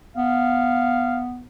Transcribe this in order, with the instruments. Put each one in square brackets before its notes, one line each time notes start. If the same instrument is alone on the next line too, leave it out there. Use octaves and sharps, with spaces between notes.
[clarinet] B3 [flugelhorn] F5